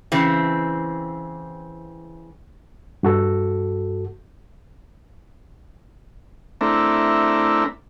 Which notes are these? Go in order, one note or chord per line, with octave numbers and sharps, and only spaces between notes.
C#3 E3 C4
G2 F#4 A4
A3 C4 D4 E4 A#4